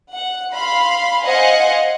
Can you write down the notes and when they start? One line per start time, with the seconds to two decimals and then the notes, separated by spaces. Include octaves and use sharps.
0.12 F#5
0.53 F5 B5 C6
1.24 C5 D#5 F5 F#5 G#5